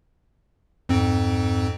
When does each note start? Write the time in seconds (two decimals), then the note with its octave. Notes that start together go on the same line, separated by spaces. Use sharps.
0.89 F2 G#2 C4